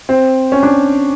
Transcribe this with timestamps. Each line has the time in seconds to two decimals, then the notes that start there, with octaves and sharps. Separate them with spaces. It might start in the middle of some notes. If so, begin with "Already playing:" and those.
0.09 C4
0.52 C#4
0.63 D4